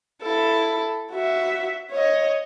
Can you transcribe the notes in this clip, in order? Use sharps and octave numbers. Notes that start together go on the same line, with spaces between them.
E4 A4
F#4 E5
C#5 D#5